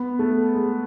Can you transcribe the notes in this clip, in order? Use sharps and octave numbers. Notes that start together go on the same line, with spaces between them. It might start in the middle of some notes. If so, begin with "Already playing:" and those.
Already playing: B3
A3
G#3